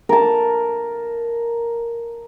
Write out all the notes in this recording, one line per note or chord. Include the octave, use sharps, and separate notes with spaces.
A#4 A5